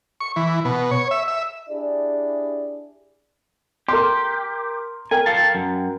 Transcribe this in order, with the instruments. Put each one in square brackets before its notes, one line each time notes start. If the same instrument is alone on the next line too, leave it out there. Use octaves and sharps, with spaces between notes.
[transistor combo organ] C#6
E3
B2
C#5
E5
E5
[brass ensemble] D4 E4 G4 G#4 D5
[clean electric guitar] G4 [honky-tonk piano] A#4 C6
[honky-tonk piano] A#4 G5 [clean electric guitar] G#5
[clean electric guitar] A4 F5 A5
F#2